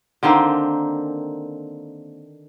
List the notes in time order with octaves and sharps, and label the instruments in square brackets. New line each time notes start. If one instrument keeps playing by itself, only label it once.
[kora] D3 D#3 A#3 C4